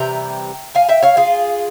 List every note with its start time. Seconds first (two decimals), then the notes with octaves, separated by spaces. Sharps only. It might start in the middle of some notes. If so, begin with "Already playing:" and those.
Already playing: C3 E3 G3 G5 A#5
0.75 F5 G#5
0.88 E5 G5
1.02 C#5 F5
1.17 F4 G#4